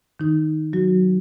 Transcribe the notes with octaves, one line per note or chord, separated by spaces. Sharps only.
D#3 D#4
F#3 F#4